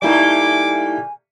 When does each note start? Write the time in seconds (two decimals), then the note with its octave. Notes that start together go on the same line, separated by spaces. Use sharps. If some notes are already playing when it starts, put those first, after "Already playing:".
0.02 G3 A3 A#3 D#4 E4 D5 G#5 D6